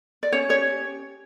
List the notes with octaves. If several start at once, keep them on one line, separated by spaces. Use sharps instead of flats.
D5
C#4 C#5
G4 C#5
C#4